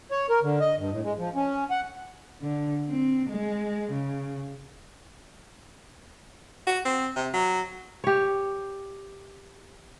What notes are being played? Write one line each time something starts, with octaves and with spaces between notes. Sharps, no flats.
C#5
A#4
D3
D#5
G2
A2
G#3
F3
C#4
F#5
D3
C4
G#3
C#3
F#4
C4
C3
F#3
G4 C#5